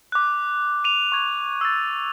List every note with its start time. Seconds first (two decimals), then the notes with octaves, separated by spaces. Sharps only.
0.12 D6 F#6
0.84 D#7 F7
1.12 C#6 G#6
1.61 E6 A6